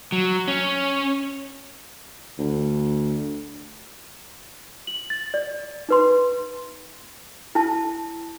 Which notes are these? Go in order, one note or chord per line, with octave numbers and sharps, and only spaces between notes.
F#3
C#4
D2
F#7
A6
D5
D#4 B4 C6
E4 A5